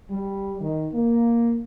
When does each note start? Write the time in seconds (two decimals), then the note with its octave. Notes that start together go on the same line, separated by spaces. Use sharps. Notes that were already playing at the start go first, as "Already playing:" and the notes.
0.10 G3
0.61 D#3
0.93 A#3